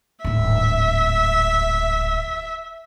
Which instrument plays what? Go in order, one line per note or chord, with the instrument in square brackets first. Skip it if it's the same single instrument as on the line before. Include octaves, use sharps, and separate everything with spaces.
[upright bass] D1 G#1 [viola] E5